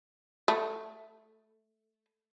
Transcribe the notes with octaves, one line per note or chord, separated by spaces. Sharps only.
A3